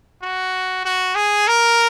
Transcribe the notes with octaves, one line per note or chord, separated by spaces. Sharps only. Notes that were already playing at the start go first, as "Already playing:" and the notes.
F#4
F#4
G#4
A#4